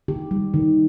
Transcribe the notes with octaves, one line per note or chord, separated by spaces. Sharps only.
D#3 G4
G3
D#3